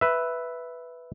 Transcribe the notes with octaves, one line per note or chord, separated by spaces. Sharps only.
B4 E5